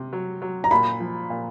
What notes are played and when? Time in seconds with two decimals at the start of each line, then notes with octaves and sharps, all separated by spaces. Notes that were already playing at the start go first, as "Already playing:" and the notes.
Already playing: C3
0.13 F#3
0.42 F#3
0.64 A#5
0.71 A#2 B5
1.00 F3
1.30 A#2